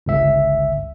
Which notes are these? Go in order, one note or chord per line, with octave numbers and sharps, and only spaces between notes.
G1 C#2 E5